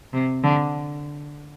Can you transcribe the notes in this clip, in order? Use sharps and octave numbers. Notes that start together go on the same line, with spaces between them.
C3
D3